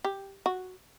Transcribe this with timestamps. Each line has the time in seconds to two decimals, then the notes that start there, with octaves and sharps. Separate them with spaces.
0.04 G4
0.46 F#4